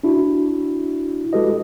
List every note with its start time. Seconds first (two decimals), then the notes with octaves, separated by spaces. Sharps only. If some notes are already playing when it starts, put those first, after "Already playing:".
0.03 D4 E4 F#4
1.33 G#3 F#4 G4 A4 B4 D#5